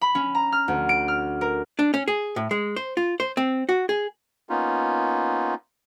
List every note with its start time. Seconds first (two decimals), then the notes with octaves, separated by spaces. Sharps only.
0.01 B5
0.15 C#4
0.35 A#5
0.52 F6
0.68 D2
0.89 D7
1.08 F6
1.41 A#4
1.79 D4
1.94 C#4
2.08 G#4
2.36 A2
2.51 G#3
2.76 C5
2.97 F4
3.20 C5
3.37 C4
3.69 F#4
3.89 G#4
4.49 A#3 B3 C#4 D#4 F4